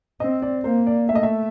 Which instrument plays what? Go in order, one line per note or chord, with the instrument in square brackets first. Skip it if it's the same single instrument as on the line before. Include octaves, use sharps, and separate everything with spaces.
[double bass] C4 [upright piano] D#5
[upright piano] D5
[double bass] A#3 [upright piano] C5
[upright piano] D5
[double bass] A3 [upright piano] E5
[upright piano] D#5
E5